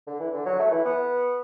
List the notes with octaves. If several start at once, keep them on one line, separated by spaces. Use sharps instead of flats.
D3
E3
D3
F#3
A3
E3
B3